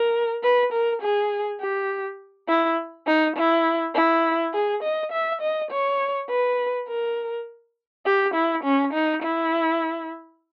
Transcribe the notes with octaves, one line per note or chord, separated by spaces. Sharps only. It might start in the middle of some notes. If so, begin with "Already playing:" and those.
Already playing: A#4
B4
A#4
G#4
G4
E4
D#4
E4
E4
G#4
D#5
E5
D#5
C#5
B4
A#4
G4
E4
C#4
D#4
E4